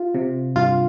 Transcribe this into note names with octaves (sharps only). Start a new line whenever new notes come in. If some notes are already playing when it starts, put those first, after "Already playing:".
Already playing: F4
C3
G2 F4